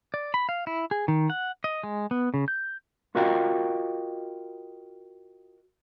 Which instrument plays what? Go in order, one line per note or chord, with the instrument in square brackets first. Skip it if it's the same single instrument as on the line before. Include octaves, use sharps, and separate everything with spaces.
[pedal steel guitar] D5
B5
F5
E4
G#4
D#3
F#5
D#5
G#3
B3
C#3
G6
[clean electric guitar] F4 F#4 A#4 D#5 F5 G5